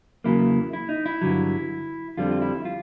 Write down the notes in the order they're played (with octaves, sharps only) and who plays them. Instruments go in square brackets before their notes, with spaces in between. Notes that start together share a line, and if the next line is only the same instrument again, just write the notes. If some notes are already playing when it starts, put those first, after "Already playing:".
[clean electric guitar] E2 C#3 F#3 A#3 E4
E4
D#4
E4
G2 D3 F#3
F2 D3 G3 C4 F4
F4
E4
F4